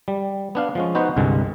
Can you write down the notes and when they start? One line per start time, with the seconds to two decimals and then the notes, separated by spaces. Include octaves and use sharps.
0.08 G3
0.55 B3 D4 F5
0.75 F3 G#3 C#4
0.95 B3 D#4 F#4 B4 C5 F#5
1.16 C2 G2 D3 G#3